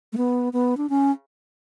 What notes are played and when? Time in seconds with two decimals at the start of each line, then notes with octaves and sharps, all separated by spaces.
0.13 A3
0.17 B3
0.53 B3
0.77 D4
0.90 C#4